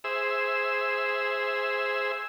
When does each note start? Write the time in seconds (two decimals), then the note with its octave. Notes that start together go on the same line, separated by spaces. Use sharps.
0.04 G#4 C5 E5 E6